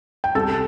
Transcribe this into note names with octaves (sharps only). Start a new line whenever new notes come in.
G5
C2 A4 A5